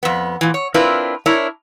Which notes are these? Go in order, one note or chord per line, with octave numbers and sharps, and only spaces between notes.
F2 B3
A#2 E3
C#5
C4 D4 E4 F4 A#4 B4
D4 E4 A#4 C#5